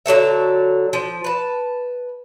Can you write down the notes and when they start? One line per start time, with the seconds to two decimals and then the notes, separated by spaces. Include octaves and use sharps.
0.06 D3 F#3 A4 E5
0.93 F3
1.24 B4 A5